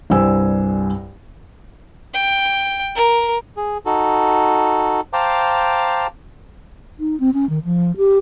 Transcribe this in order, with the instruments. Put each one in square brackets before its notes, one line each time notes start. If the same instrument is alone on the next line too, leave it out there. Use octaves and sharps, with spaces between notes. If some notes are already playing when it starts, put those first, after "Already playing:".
[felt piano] C2 G2 C5 G#5 E6
[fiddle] G5
A#4
[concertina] G#4
D#4 F#4 A4
C5 F5 G5 A5 A#5 D6
[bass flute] D#4
C4
C#4
D#3
F3
G4